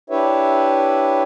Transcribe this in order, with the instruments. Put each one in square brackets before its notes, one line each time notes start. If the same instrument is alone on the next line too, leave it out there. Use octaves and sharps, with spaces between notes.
[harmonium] D4 E4 G4 B4 C#5 E5